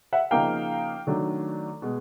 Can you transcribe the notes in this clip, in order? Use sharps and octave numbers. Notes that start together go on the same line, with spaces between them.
E5 F#5
C#3 F3 A#3 D#4 F5 G5
D#3 F#3 A3 D4
B2 G#3